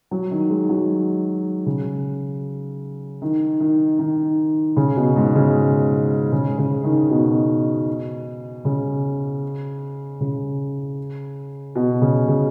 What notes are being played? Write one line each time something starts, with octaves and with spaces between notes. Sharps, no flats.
F#3
D#3
G#3
F#3
C#3
D#3
D#3
D#3
C#3
B2
G#2
C#3
C#3
C#3
D#3
B2
C#3
C#3
B2
C#3
C#3